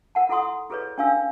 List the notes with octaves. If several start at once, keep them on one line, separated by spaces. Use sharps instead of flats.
A#4 F#5 A5
E4 A4 F#5 C6 D#6
E4 G#4 A4 B4 C#5 D5
C#4 D4 D5 F5 G#5 E6